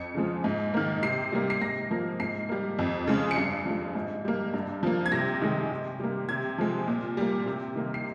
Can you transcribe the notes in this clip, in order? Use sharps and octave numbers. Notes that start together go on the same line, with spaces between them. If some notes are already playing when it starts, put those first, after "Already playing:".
Already playing: F2 C#7
C#3 F3 G#3
G#2
D#3 A#3
C3 C7
G3 A#3
C7
G#2 A#6
F3 A#3
G#2 C7
G3 A#3
F2
C#3 G#3
C#7
G2 C7
F3 G#3
G#2
G3 A#3
G2
F3 A#3
G#6
C3 A#6
D#3 G#3
C3
G3 A#3
C3 G#6
F3 G#3
A#2
G3 A#3
C3
D#3 A#3
C7